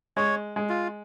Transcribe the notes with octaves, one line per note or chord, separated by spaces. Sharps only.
G#3 C#5
G#3
F4